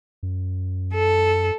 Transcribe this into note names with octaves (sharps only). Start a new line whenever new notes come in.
F#2
A4